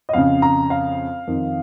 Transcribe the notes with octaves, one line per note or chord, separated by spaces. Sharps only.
D#5
F2 C#3 F5
A#5
F5
F2 D#3